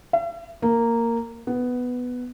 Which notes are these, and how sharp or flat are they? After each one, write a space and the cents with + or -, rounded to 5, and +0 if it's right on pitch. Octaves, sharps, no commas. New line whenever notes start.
E5 +45
A#3 -10
B3 +5